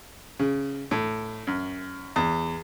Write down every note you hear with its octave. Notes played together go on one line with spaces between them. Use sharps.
C#3
A2
F#2
E2